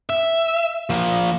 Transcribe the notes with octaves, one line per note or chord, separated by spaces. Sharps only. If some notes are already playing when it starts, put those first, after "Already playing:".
E5
F3 A#3